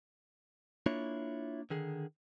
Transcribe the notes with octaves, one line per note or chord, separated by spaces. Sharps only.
A#3 D4 E4 F4 C#5
D3 D#3 G#4